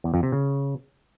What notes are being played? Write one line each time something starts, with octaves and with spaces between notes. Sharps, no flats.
E2
F2
C3
C#3